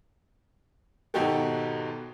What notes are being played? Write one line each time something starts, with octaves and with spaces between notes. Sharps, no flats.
G#1 B2 D#4 F#4 G4 A4